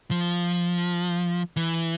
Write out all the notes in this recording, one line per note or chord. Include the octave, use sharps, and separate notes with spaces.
F3
E3